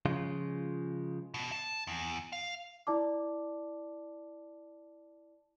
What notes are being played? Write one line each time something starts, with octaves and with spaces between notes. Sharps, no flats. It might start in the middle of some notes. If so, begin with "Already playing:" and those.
C#3 F3 G#3 F4
B2
A5
E2
F5
E4 D5 A5 D6